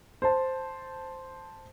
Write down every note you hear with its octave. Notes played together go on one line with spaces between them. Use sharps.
C5 A5